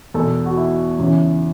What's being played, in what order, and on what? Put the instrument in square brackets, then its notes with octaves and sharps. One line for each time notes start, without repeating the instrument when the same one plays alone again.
[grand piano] E2 B2 A4
F#4
E4
E2 C#3 E3 C#4